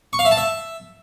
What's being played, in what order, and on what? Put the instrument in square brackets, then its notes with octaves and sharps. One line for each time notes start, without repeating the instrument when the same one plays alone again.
[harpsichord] C#6
F5
E5
A5
E5